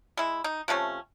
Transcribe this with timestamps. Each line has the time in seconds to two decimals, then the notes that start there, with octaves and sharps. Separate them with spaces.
0.17 G#3 E4
0.44 D#4
0.68 C3 F3 A3 C#4